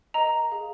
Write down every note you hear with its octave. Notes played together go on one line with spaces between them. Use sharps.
A#4 D#5 A#5
G#4 F5